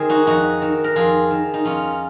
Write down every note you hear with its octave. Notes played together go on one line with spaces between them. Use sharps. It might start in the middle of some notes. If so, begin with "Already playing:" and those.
Already playing: D#3 C4 G#4
D#4 F#4
F2 D#4 F#4
D#3
A#4
F2 F4 G#4
D#3
D#4
F2 C#4 F4